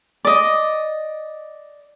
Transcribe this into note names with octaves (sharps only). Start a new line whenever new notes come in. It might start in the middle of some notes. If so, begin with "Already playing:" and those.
D5 D#5